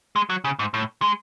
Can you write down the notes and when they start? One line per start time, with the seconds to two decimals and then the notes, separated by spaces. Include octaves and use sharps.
0.16 G#3
0.30 F#3
0.44 C#3
0.59 G#2
0.74 A2
1.02 G#3